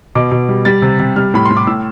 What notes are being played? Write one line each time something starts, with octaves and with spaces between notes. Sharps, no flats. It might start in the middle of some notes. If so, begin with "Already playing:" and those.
B2 D6
B2
G3
G3 A6
C3
C3
G3 F6
A2 B5
A2 C6
D6
A2 E6